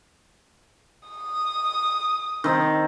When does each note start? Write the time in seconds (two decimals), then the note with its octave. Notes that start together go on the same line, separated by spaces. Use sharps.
1.08 D#6
2.44 D#3 C4